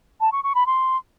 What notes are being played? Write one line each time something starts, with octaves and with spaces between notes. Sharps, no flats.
A5
C#6
C#6
B5
C6